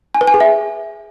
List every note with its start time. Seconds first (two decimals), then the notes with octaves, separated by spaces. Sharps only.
0.14 G#5
0.21 B4
0.27 G#5
0.34 G#4
0.40 E5